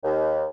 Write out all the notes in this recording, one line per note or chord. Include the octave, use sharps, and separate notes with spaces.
D#2